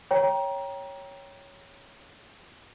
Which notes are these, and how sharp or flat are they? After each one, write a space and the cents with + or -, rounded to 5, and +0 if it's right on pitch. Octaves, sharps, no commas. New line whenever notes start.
C#5 +0 G5 +0 A#5 +20